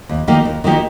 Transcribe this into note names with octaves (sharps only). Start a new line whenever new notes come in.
D#2
D#3 A#3 D#4 G4
D#2
D#3 A#3 D#4 G4